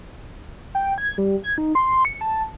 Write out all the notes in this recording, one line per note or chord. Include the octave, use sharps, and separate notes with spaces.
G5
G#6
G3
G#6
D#4
C6
C#7
A5